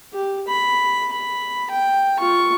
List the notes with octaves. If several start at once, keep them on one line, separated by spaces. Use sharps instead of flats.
G4
B5
B5
G5
F4 C#6